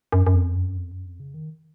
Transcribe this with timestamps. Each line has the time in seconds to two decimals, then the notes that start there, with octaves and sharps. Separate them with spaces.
0.12 F#2
0.27 F#2
0.34 F2
0.55 F#2
0.77 F2
0.92 F#2
1.06 F2
1.20 C#3
1.34 D#3